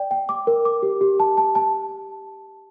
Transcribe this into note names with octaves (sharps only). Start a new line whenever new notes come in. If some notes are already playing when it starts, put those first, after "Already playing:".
Already playing: D5 G5
G5
D6
A#4
D6
G4
G4
A5
A5
A5